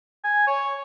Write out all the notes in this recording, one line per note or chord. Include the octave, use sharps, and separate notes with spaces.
G#5
C#5